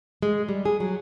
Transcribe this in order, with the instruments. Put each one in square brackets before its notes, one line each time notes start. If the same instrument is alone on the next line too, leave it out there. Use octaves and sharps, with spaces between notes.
[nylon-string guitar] G#3
G3
G#4
F#3